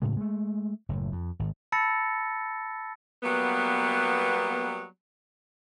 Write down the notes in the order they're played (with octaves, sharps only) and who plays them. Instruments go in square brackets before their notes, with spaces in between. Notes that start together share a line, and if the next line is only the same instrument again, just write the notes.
[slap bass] A2 C#3 G#3
G#3 A3
F#1 A2
F2
G#1
[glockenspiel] A5 B5 E6 A6 A#6 C#7
[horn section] F#3 G3 A#3 B3